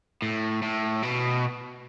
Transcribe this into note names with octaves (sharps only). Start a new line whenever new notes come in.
A2
A2
B2